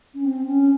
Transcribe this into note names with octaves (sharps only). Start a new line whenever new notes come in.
C#4
C4
C#4